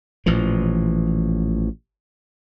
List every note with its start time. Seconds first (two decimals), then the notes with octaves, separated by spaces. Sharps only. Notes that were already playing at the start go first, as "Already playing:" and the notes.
0.26 A1 A#2 E3 F3